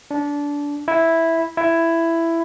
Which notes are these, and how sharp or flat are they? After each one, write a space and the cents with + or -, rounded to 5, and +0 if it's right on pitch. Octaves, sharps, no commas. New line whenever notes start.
D4 -20
E4 -5
E4 +10